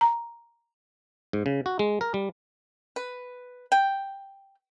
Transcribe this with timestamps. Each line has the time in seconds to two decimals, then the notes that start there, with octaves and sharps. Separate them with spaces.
0.01 A#5
1.33 G#2
1.46 C#3
1.66 F#4
1.79 G#3
2.01 A#4
2.14 G3
2.96 B4
3.72 G5